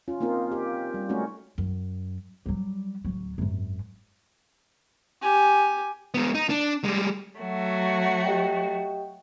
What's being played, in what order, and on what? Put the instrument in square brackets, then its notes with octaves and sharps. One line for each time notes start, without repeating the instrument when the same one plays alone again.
[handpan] C#4 F4
A#3 C4 D#4 F4
G4
G3
G#3 A3 C#4 D#4 F#4
[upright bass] F#2
F#3 G3
D1 F#3
G#1 F#2
[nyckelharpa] G4 G#5
[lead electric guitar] G#3 B3
D#4
D4
G3 G#3
[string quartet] F#3 A3 F#4
[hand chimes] G4 D#5 G5